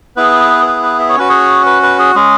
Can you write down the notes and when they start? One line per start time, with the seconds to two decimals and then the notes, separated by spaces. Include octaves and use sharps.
0.16 B3 E4 G#4 B4
0.67 B4
0.83 B4
0.99 E5
1.09 C#5
1.16 C#4 F#4 B4
1.29 G#4 C#5
1.66 B4
1.83 B4
1.99 G#4
2.15 G#3 C#4 G#4